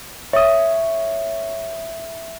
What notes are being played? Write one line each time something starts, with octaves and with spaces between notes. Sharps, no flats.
C#5 E5 D#6